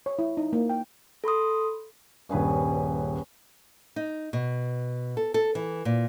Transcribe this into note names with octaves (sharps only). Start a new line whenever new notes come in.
C#5
E4
D#4
A#3
G5
A4 B5 C6 D#6
D#1 G2 C#4 G#4 B4
D#4
B2
A4
A4
E3
A#2